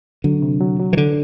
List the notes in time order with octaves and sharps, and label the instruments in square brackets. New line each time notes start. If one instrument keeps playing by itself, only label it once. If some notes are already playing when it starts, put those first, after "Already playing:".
[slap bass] D3 [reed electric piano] F#3
[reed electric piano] C3
F#3
F#3
[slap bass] E3
[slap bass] D3 [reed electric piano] D4